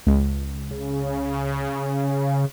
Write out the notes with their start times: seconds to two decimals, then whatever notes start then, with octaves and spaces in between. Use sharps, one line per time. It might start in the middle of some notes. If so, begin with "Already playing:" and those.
0.06 C#2
0.71 C#3